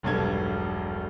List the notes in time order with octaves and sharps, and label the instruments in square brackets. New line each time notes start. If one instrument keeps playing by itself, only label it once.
[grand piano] E1 B1 G2 A4 G#6